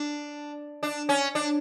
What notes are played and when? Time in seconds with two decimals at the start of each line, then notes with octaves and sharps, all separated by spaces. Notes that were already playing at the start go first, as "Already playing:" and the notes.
Already playing: D4
0.83 D4
1.09 C#4
1.35 D4